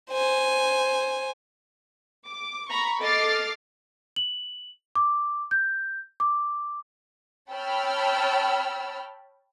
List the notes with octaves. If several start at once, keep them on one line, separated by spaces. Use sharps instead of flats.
C5 G#5
D6
A#5 B5 C#6
A4 D#5 D6 F6 A6 C7
F#7
D6
G6
D6
C#5 G5 A5 B5 E6 F6